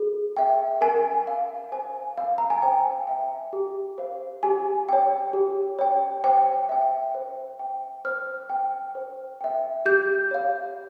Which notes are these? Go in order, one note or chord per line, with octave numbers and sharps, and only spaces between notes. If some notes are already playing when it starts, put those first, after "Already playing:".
Already playing: G#4
E5 G5
A#4 G#5
F5
C5 G#5
F5
A#5
G#5
C5 G5
E5 G5
G4
C5 F5
G4 G#5
C#5 G5
G4
C#5 G5
C5 G5
E5 G5
C5
G5
C5 F6
G5
C5
E5 G5
G4 G6
C#5 F5